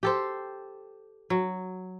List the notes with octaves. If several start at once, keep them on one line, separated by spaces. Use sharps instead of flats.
G4 A4 C5
F#3